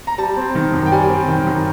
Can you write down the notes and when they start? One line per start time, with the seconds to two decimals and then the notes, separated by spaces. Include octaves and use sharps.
0.07 A#5
0.18 G3 A5
0.37 C4
0.55 D#3
0.73 F#2
0.86 G5
0.92 G3 G#5
1.10 C4
1.28 D#3 G5
1.47 F#2